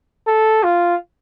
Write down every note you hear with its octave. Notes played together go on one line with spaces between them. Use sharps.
A4
F4